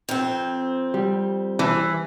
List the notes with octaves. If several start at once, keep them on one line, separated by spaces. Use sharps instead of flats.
F2 C4
G3
E3